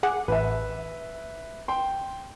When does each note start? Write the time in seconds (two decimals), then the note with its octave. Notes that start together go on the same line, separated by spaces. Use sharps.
0.03 G#4 F#5 D6
0.28 A1 B4 E5
1.68 G5 C6